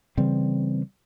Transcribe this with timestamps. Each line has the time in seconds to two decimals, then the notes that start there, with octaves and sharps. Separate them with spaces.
0.17 C#3 E3 G3 C4